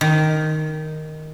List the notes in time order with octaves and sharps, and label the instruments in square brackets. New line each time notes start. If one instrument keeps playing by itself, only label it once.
[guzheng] D#3